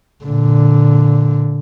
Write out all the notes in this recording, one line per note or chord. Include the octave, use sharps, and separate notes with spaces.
A#2 D3